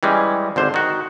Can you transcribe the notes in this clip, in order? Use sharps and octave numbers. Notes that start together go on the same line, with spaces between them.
E3 G3 G#3 C#4
G#1 D3 C5
D#3 F#4